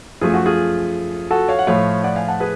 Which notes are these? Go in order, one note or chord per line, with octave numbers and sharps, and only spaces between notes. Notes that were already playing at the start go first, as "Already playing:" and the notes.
F#2 F3 A3 F4 G#4
F#4
F4 G#4
F#4 A4
C#5 F5
F#5
A2 F3 A3 C#5 F5
D5 F#5
F5 G#5
F#5 A5
G#4 B4